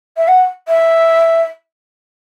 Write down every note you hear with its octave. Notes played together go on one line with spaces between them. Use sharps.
E5
F#5
E5